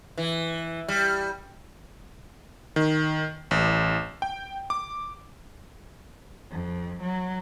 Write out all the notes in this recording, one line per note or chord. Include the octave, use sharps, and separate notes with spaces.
E3
G3
D#3
A1
G5
D6
F2
F#3